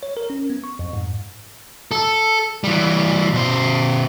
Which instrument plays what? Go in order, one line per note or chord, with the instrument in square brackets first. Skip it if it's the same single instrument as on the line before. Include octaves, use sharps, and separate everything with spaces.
[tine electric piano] C#5
A#4
C#4
B3
C#6
F2
G#2
[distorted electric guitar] A4
E3 G3
B2 C5